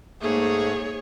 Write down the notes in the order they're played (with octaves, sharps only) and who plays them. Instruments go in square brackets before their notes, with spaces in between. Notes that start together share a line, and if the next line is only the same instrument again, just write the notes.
[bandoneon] G#2 A3 [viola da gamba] A#3 [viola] G#4 C#5